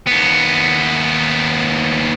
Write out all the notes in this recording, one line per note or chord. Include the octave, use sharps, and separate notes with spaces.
D#2 B3